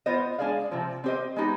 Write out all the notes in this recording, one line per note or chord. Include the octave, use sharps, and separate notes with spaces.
B3 F4 C5 D#5
G#3 D4 G#4 D5 F5
C3 F3 C4
C4 G4 C5 D#5
G#3 B3 D#4 G4